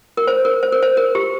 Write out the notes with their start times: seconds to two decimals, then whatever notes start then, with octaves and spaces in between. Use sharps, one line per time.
0.17 A#4
0.27 C5
0.45 A#4
0.63 C5
0.72 A#4
0.83 C5
0.97 A#4
1.15 G4